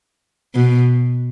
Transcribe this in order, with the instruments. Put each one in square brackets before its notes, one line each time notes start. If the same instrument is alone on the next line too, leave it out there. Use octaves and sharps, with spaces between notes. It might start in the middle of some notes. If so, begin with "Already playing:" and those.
[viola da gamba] B2